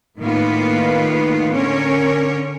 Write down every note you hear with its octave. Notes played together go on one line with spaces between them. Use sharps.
A2 D#3 A#3 B3 F4 B4
D3 C#4 A#4 C#5